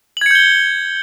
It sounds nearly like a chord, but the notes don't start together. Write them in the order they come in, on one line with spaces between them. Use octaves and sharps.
F#7 G#6 C#7 G6 G7